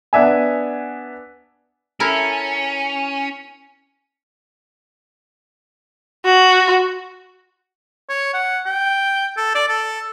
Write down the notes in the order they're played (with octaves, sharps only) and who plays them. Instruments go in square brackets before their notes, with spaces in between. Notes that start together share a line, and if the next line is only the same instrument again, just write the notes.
[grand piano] B3 D4 E5 G#5
[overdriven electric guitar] C#4 [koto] E4 A4 A#4
[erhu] F#4
[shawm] C#5
F#5
G5
A4
D5
A4